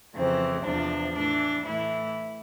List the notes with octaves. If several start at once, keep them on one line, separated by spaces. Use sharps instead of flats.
F2 C#3 E3 C4
E2 C3 F3 D4
A2 E3 D4
A2 E3 E4